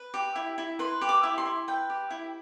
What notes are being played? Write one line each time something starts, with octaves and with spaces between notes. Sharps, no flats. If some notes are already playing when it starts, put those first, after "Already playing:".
Already playing: B4
G4
E4
E4
B4 C6
G4
D6
E4
C6
E4
B4 G5
G4
E4